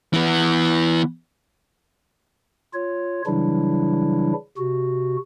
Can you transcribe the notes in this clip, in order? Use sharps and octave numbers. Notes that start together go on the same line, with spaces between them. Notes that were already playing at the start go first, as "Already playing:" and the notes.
E3 B3
F4 C#5
C#3 E3 F#3 G3 D4 E4
C3 F#4